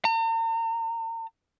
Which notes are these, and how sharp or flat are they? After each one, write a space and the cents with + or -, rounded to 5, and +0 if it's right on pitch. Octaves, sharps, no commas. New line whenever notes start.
A#5 -45